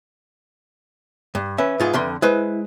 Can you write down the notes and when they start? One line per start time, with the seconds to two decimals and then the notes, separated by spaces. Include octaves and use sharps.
1.35 G2
1.58 C#4 B4 E5
1.80 G#2 F4 G#4
1.93 F2 D3 C6
2.22 G#3 E4 B4 C5